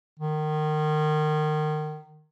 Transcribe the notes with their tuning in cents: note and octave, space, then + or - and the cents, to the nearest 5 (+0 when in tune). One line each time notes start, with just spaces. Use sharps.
D#3 -25